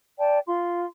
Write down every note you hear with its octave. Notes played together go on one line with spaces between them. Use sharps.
D5 G5 A5
F4 C6